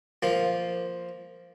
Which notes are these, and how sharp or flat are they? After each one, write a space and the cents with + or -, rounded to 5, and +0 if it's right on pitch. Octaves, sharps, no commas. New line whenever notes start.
F3 +0 A#3 +0 F4 +0